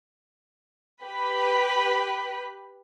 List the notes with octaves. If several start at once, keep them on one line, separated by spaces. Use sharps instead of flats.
G4 B4 B5